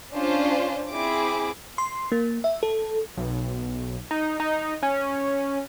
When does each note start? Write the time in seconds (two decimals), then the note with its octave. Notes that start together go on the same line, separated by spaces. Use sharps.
0.14 C#4 D4 F4 C5
0.90 C4 E4 G#4 D6
1.78 C6
2.12 A#3
2.44 E5
2.63 A4
3.17 B1
4.11 D#4
4.40 D#4
4.83 C#4